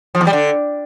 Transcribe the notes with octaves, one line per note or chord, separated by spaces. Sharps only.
F3
E2
G3
D3